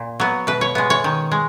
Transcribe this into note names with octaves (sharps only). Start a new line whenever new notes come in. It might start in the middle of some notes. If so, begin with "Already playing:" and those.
Already playing: A#2
F#3 B3
B2 B4
C#5
G#3 B3
C#5
D#3
G#3